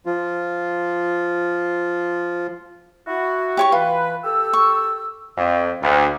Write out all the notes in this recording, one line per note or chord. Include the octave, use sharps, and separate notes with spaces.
F3 F4
E4 F#4
G4 C#5 C#6
E3 F4 B4
G4 A4 E6
C#6
F2
D2